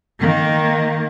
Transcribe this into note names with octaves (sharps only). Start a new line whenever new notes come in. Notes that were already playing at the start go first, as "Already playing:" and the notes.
D#3 A#3